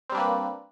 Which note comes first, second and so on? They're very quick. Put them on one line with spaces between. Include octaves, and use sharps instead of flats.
C4 G3 D4 A#3 B4